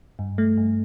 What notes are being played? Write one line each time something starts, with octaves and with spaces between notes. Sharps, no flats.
G2
A3
G2